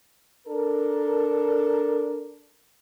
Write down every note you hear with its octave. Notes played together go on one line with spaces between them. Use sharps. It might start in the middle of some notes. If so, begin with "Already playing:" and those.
D4 A4 A#4